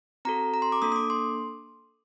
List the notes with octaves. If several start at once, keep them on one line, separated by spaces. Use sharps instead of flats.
C4 F#4 A4 A#5
A#5
C6
D6
A#3 D4 A4 D#6
D#6
D6
C6